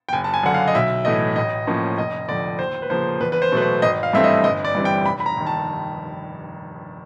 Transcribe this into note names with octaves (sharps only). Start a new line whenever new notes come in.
G5
F#1 G#5
A5
G#5
F#2 D3 F#5
F5
D#5
B1 E5
A2 E3 A3 D#5
A1 D#5
A2 F3 A#3 C#4
F1 D#5
F2 D3 D5
D#2 C5
B4
C#3 F3 A#3 C5
E2 B4
B4
C5
B2 F#3 A3 B4
C5
G#1 D#5
F5
G2 E3 A3 C4 E5
D#5
G1 D#5
D5
G2 E3 G3 C4
G5
F1 B5
B5
A#5
D#2 D#3
A5